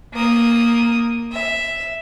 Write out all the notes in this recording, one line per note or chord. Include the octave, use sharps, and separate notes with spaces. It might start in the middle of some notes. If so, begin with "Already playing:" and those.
A#3 D#6
E5